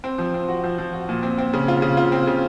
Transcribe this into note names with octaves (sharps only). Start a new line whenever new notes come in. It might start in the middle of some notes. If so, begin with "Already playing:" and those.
C4
F3
C4
F#4
F3
F3
F#4
A#2
C4
C4
C#3
F4
C#3
F4
C4
C#3